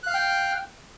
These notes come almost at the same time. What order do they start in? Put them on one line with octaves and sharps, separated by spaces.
F#6 F5 F6 G5